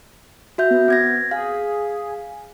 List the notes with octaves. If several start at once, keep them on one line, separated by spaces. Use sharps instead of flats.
F#4 E5 G6
B3
C4 G#6 A#6
G#4 F5